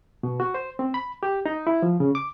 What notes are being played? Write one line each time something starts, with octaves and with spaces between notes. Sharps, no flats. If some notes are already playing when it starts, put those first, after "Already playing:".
B2
F#4
C5
C4
B5
G4
D#4
E4
F3
C#3
D6